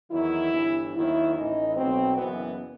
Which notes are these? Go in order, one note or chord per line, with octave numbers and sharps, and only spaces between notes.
E2 D#3 F#3 E4
G1 G2 E3
D#2 D#3 F#3 E4
A1 A2 E3 D#4
B1 B2 F#3 C4
F#1 F#2 E3 B3